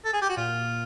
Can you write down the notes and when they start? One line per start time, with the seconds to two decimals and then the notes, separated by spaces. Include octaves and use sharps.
0.05 A4
0.13 G#4
0.22 G4
0.29 F#4
0.37 A#2 F4